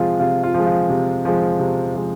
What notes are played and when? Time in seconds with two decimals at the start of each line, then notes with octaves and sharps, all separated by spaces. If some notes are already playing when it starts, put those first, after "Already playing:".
Already playing: C3 F3 G#3 F4
0.20 C3 F4
0.43 F4
0.54 F3 G#3
0.66 F4
0.90 C3
1.25 F3 G#3
1.59 C3
1.95 F3 G#3